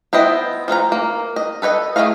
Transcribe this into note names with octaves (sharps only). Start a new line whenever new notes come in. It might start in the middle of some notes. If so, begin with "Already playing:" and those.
B3 E4 C5 D#5 G5
F3 F4 A4 A#5
A#3
D#5
A4 B4 C#5 D#5
A3 C4 G#4 D#5 F5